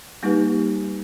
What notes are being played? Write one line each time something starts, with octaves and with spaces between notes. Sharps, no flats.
G3 A#3 D#4 G4 B4